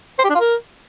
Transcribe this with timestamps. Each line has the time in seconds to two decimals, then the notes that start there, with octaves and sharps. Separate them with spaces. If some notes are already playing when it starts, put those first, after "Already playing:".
0.19 C5
0.24 G4
0.30 D4
0.35 F4
0.40 A#4